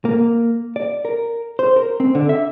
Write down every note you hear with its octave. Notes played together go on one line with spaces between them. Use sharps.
A#3
D5
A#4
C5
A#4
C4
D3
E5